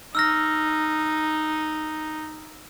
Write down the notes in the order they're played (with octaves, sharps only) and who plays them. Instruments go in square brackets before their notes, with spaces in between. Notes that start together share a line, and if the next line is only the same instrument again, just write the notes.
[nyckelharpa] D#4 [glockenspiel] E6 F6 A#6